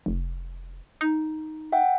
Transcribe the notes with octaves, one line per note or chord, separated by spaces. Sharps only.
F1
D#4
E5 F#5 G5